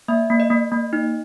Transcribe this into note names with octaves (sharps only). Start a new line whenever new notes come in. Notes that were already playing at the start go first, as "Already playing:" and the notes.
A#3 E5
A#3
D#5
A#3
A#3
D#4